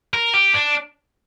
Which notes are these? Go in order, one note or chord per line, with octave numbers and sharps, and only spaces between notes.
A#4
G4
D4